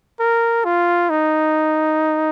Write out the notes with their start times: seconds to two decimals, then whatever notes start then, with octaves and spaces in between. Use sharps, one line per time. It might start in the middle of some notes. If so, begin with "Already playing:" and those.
0.20 A#4
0.65 F4
1.10 D#4